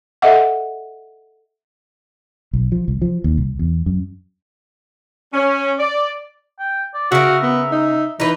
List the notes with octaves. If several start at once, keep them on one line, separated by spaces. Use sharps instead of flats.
A4 D#5 E5 F#5
B1
F3
C2
F3
D#2
C2
E2
F#2
C#4
D5
G5
D5
C#3 F#4 A#4 E5
B3
D#4
E3 D#4 B4